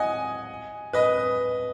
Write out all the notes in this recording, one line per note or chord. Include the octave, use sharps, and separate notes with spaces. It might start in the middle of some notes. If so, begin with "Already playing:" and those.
Already playing: D#5 F#5 G#5
B4 D#5